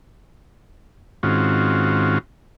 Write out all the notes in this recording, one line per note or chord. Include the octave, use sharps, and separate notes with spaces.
G#2 D#3 C4 C#4 F4 F#4